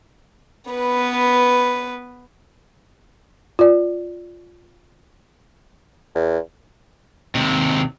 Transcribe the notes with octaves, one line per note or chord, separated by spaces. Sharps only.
B3 B4
F4 D5
E2
D#2 C3